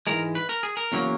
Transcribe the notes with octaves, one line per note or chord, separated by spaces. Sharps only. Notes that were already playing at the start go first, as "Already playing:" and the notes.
G#2 E3 G#3 A#4
B4
A#4
G#4
A#4
E2 C#3 F#3 A#3